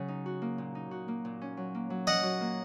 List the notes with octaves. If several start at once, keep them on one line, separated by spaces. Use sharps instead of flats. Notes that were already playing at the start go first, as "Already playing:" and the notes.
Already playing: C#3 F#3 C#4 F#4
D#4
F#4
A#3
A#2
D#4
F#4
A#3
A#2
C#4
F#3
A#3
F#3
C#4 D#5 F#5
F#3
A#3